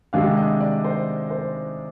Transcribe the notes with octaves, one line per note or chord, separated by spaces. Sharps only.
C3 D#3 G#3 D4 F5
D#5
D5
C5
C5